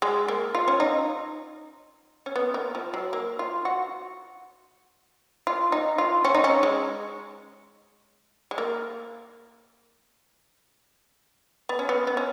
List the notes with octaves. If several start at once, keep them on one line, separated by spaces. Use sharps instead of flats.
G#3
A#3
F4
C#4
D#4
C#4
B3
A#3
F3
F#3
A#3
F4
F#4
F4
D#4
F4
C#4
D#4
C#4
G#3
G#3
A#3
B3
C#4
B3
B3
C#4